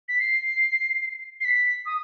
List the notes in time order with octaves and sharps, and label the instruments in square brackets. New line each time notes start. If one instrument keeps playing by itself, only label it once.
[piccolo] B6
C7
C7
B6
D#6